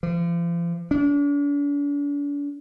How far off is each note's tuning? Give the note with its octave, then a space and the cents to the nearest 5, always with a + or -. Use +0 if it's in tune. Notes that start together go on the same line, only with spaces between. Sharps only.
F3 -40
D4 -40